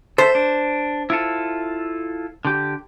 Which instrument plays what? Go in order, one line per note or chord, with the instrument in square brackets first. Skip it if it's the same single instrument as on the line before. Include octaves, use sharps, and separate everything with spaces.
[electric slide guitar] A4 E5 [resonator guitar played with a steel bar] C5
[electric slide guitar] D4
E4 F4 A4
D3 G4